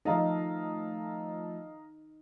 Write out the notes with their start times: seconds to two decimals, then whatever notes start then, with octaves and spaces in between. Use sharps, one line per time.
0.05 F3 A3 D#4 A4 D#5 F5 A#5